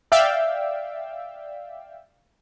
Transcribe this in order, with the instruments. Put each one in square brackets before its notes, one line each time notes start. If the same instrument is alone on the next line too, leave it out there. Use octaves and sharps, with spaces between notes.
[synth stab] D5 E5 F5 G5 E6